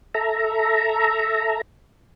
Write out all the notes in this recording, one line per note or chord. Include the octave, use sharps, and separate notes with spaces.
A4 E5 A#5